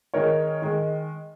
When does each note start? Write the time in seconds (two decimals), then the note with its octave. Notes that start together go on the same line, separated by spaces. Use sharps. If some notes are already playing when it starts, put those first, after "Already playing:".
0.14 D#3 G#3 D#4 A#4 C#5
0.62 D#3 G#3